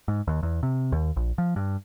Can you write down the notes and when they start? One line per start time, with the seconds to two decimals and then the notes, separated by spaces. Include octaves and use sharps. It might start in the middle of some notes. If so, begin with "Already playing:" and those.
0.08 G#2
0.28 D#2
0.43 E2
0.63 C3
0.92 D#2
1.16 A#1
1.38 F3
1.56 G2